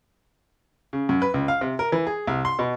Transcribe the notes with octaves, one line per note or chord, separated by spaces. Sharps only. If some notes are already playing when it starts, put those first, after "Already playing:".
C#3
F#2
B4
C#2
F5
C3
A#4
E3
G#4
C2
C6
B2